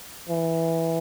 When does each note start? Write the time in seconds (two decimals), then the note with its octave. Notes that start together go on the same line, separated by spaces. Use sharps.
0.29 E3